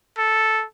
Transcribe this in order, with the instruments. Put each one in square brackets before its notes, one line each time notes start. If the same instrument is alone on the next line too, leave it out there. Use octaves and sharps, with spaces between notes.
[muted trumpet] A4